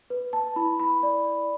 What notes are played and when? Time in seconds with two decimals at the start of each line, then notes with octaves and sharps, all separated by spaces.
0.10 B4
0.33 A5
0.56 E4 B5
0.80 B5
1.03 D5